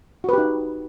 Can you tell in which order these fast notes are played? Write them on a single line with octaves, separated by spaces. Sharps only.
F#4 B4 G4 D#4